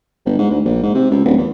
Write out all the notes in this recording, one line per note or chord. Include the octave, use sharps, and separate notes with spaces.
G1
G#2
D2
A#1
G#2
C3
C#2
D1
E2